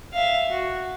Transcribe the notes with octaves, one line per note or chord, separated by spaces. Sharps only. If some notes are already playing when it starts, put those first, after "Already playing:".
E5 F5
F#4